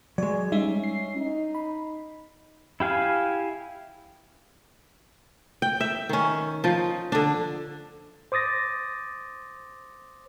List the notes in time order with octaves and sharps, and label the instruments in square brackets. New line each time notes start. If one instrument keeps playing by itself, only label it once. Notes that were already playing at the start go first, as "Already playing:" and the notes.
[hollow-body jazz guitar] F#3 G#3 [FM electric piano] D5
[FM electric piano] G3 G#3 D#4 [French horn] C#4 [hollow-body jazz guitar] E5
[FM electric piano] C7
[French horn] D#4
[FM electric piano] B5
[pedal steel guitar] E4 G4 F5 G#5
[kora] G5
E5 G5
D#3 C#4
F3 D#4 F4
D3 D4
[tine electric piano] C5 D6 D#6 A6 A#6